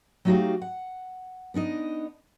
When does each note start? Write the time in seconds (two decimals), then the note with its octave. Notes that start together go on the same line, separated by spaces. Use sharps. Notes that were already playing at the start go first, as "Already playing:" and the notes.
0.25 F#3 A3 D#4 F#4 G4 F5
0.62 F#5
1.54 B3 D4 D#4 D#5